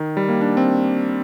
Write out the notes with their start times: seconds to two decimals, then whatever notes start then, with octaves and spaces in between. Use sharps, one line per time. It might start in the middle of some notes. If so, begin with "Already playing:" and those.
Already playing: D#3
0.17 G3
0.29 A#3
0.41 D4
0.57 C4